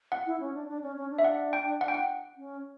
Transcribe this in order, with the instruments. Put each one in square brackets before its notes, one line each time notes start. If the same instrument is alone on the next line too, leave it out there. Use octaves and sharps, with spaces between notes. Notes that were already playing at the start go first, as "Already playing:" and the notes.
[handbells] F#5
[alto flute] E4
C#4
D4
D4
C#4
C#4
D4
[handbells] E5
F#5
G5
F#5
G5
F#5
[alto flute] C#4